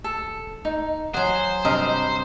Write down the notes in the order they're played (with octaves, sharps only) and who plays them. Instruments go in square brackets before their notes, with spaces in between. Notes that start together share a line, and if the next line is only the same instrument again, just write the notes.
[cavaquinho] A4
D#4
[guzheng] F#3 G#4 [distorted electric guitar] C5 [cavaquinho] F#5
[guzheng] G2 C3 A#4 [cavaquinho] D#5 B5